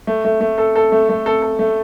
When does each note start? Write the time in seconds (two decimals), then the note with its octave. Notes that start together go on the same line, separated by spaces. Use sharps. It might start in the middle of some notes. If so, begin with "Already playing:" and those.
0.07 A3
0.25 A3
0.41 A3
0.58 A4
0.76 A4
0.92 A3
1.09 A3
1.26 A4
1.42 A4
1.59 A3